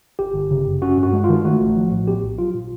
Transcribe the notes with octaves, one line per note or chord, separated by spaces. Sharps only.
G1 G4
G1
C#3
F#2
C#4 F#4
G2
F#4
G#3
F4
D#3
A3 F#4
A1
F3
A2
B3 G4
A#1
F#3 F4
A#2